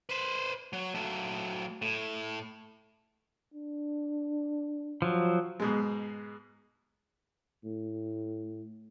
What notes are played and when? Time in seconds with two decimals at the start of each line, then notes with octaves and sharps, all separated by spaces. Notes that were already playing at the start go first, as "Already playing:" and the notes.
0.09 B4 C5
0.73 F#3
0.95 F#3 A3
1.82 A2
3.54 D4
5.02 F3 F#3
5.60 G#2 B2 G#3
7.64 A2